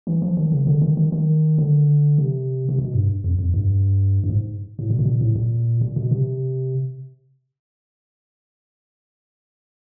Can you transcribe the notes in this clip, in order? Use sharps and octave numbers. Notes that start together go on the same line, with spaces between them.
E3
F3
D#3
C#3
D3
D#3
D#3
D#3
D3
C3
C3
B2
G2
F2
F2
G2
G2
G#2
A2
A#2
B2
A#2
A2
A#2
A#2
B2
C3